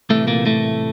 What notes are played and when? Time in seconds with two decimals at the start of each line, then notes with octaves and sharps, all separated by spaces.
0.09 C2 A2 C3 E3 A3
0.28 A#2 A#3
0.46 A2 A3